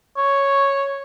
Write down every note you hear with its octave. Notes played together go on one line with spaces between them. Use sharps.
C#5